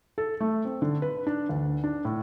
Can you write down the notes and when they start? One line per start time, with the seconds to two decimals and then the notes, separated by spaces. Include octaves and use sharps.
0.18 A4
0.41 A3
0.65 C4
0.82 D3
1.02 B4
1.27 D4
1.49 D2
1.84 D4
2.05 A2